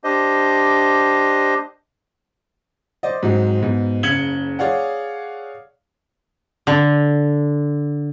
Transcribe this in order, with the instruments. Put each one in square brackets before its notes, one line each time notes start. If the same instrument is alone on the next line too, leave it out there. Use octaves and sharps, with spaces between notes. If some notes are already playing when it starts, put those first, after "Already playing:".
[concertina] D4 G4 C5 D#5
[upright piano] C5 D5 D#5
G#2 F#3 G#3 C4
G#2 B2
F#1 C#3 G#6 C#7 F#7 G7
G#4 C#5 D5 F5 F#5
[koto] D3